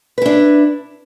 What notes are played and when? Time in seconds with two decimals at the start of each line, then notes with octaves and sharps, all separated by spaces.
0.18 B4
0.22 E4
0.26 D4